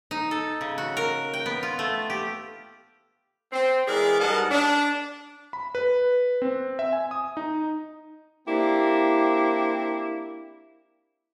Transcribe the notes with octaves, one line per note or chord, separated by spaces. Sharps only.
D#4
A4
C#3
F#4
A#4
G5
B3
F4
A3
G4
C4
E3 G#3 G#4 A#4 B4 D5
G#2 G3 A#4 D#5 F#5 A5
D4
B5
B4
C4
E5
G#5
D#6
D#4
A#3 C4 D4 E4 G4